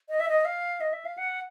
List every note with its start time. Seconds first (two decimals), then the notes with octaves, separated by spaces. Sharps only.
0.09 D#5
0.20 E5
0.29 D#5
0.45 F5
0.81 D#5
0.93 E5
1.05 F5
1.18 F#5